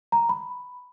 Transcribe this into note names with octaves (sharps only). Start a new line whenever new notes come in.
A#5
B5